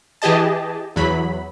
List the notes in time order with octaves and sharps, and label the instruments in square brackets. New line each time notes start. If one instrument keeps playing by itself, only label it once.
[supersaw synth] E3 G4 G#4 D#5 A5
E2 F#3 B5